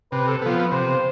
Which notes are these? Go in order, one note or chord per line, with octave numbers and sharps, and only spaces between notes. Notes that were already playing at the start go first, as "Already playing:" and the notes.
C3 B4
A4
F3 B3
B4
C3 C5